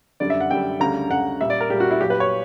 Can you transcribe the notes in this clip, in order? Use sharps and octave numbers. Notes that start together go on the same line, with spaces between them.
F#2 D3 G3 D5
E5
F#5
F#2 D3 G3 G5
D2 C#3 G3 A#5
D2 C#3 G3 F#5
A#2 G3 E5
D5
A#4
A#2 G3 G4
F#4
E4
A#2 F#3 G4
B4
C#5